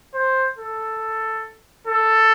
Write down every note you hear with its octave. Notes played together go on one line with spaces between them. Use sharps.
C5
A4
A4